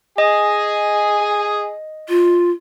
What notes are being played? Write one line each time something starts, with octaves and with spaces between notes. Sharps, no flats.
G#4 D#5 G#5
F4